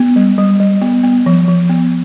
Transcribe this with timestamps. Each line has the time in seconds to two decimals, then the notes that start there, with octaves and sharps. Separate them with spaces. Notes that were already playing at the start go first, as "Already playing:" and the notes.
Already playing: B3
0.16 G3
0.38 G3
0.60 G3
0.82 B3
1.03 B3
1.26 F3
1.48 F3
1.70 B3